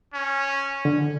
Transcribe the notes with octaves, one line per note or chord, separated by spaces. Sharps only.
C#4
D3